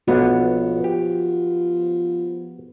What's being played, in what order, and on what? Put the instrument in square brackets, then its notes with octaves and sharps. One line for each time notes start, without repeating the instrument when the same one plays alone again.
[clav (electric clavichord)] B1 D4 C#5 [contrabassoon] F3 [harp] B3 [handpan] F#4
[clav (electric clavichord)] G4